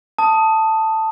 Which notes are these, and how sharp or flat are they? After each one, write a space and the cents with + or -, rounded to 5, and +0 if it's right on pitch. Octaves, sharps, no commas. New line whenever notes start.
A5 +10 D#6 +5